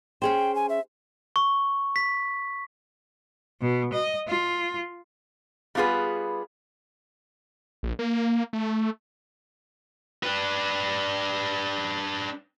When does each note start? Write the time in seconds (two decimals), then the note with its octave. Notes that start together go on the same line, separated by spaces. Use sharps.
0.22 C#4 G#4 C5 G5
0.55 G#5
0.69 E5
1.36 C#6
1.96 B6
3.61 B2
3.93 D#5
4.28 F4
5.75 G3 B3 F4 G#4 B4
7.83 A#1
7.99 A#3
8.53 A3
10.23 D4 B4